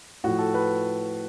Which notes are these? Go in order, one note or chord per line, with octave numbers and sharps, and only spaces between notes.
A2 F3 F#4
A4
B4